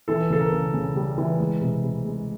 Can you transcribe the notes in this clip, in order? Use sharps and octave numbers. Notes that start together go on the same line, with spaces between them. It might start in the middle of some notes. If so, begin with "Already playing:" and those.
E3 A4
C#3 A4
A#4
C#3
C#3
G3
E3
G#3
C3
C3
G#3